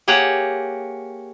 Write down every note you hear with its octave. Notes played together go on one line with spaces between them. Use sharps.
A#3 G4 G#4 C#5 F#5